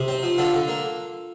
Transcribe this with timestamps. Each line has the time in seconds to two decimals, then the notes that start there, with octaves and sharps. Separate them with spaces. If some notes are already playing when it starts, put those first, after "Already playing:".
Already playing: C3 D#4
0.08 C4
0.23 F3
0.38 D3 F4 A4
0.53 D3
0.68 A#3